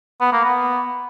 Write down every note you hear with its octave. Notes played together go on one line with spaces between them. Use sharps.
B3
A#3
B3